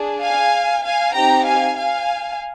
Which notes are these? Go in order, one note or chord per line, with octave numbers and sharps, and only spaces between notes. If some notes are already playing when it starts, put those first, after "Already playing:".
Already playing: D4 G#4
F5 G#5
F5 G#5
C4 D#4 G4 G5 A#5
F5 G#5
F5 G#5